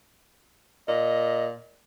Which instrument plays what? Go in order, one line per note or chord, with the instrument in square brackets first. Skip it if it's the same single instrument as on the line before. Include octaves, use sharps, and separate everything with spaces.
[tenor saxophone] A#2 [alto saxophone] D#5